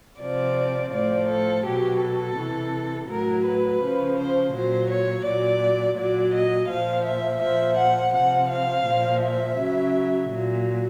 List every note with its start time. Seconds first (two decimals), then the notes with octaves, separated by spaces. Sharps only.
0.21 C3 F3 D5
0.93 A2 F3 D5
1.29 A4
1.65 B2 F#3 G4
2.01 A4
2.37 C3 E3
3.09 A2 F#3 A#4
3.45 B4
3.81 C#3 F3
4.18 C5
4.53 A#2 F#3 C5
4.90 C#5
5.25 A#2 F#3 D5
5.97 A#2 F#3 D5
6.33 D#5
6.69 A#2 F3 F5
7.05 E5
7.41 A#2 F3 E5
7.78 F#5
8.13 C3 F3 F#5
8.50 F5
8.85 A#2 F3
9.21 E5
9.58 C#3 F#3
10.29 A#2 F#3